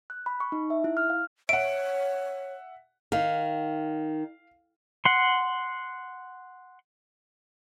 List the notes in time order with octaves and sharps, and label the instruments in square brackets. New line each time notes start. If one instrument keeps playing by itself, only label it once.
[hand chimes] F#6
B5
C#6
D#4
E5
E4
F6
F5
[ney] C#5 [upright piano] E5 F#5 [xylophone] D7
[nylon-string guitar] D#3 [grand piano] F5
[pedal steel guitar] F#5 C6